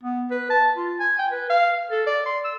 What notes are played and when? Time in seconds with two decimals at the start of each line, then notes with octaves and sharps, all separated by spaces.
0.03 B3
0.31 B4
0.50 A5
0.76 F4
0.99 G#5
1.18 G5
1.32 B4
1.50 F5
1.91 A4
2.07 D5
2.26 C6
2.44 E6